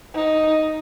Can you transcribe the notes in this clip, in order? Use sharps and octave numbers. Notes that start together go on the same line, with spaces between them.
D#4